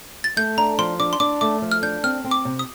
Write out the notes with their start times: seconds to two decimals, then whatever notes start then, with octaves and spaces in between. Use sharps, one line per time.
0.24 A6
0.37 A3 G6
0.57 D4 A#5
0.78 F3 C6
0.99 D4 D6
1.13 C6
1.20 D4 D6
1.41 A3 D6
1.62 F3
1.72 F6
1.82 D4 G6
2.03 C4 F6
2.24 C4
2.31 D6
2.45 C3
2.59 D#6